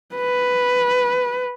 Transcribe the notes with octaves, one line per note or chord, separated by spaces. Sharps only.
B4